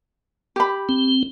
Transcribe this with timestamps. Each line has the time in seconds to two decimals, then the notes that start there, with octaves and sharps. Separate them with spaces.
0.56 G4 B5
0.89 C4